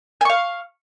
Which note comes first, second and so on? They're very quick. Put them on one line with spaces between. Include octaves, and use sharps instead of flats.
G#5 C#6 F5